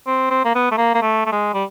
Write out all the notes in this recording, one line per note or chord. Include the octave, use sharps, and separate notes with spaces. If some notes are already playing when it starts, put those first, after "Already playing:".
C4
C4
A#3
B3
A3
A#3
A#3
A3
A3
G#3
G3